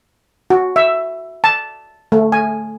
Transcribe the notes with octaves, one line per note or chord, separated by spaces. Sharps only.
F#4
E5
A5
A3
G#5